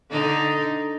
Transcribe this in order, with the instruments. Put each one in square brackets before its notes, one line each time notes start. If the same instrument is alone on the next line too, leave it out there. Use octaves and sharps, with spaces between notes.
[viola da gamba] D3 D4 D#4